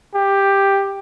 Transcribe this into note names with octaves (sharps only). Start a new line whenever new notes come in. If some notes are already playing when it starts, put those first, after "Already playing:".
G4